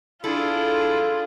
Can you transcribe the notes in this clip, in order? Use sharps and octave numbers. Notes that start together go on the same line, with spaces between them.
D4 E4 F4 G#4 A4